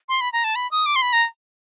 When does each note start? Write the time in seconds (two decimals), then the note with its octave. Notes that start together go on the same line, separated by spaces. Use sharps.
0.09 C6
0.21 B5
0.33 A#5
0.44 A5
0.55 B5
0.71 D#6
0.86 D6
0.96 C6
1.02 B5
1.13 A#5